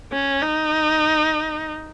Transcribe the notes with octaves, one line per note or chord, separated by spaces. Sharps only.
C#4
D#4